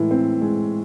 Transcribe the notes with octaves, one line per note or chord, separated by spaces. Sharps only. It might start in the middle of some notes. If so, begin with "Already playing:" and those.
Already playing: A2 E3 G#3
C4
G#3